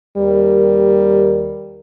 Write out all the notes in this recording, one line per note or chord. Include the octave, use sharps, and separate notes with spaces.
D#2 G3 A#4